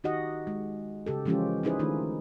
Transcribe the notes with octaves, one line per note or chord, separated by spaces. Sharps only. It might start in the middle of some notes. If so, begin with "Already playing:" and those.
D#3 D#4 F#4 G4 D#5 F#5
G#3
C#3 G4 A4
E3 F3 G#3 C#4 F4 G4
C#4 D#4 E4 G#4 B4 C5
D#3 A3 D4 D#4 F4